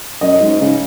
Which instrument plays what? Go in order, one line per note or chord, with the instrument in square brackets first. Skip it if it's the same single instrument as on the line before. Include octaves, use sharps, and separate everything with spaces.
[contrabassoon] F#2 [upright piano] D#5
[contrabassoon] G#2
C#3